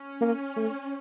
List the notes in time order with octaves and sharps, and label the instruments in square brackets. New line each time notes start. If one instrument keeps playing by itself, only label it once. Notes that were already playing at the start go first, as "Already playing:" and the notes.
Already playing: [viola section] C#4
[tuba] A#3
A3